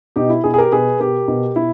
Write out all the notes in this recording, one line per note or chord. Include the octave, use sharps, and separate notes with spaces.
B2 D#4 G4
E4
B2 E4 G#4
G#4
G4 A#4
B2 G#4 B4
B2 G4 A#4
B2
B2 E4